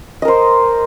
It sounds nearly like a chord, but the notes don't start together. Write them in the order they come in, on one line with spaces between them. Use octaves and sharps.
D#5 A#4 C5